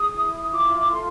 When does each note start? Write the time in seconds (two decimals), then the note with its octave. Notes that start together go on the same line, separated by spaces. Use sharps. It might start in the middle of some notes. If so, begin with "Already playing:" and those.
Already playing: G#4 D#6
0.11 E4
0.51 F4 D6
0.91 A4 C6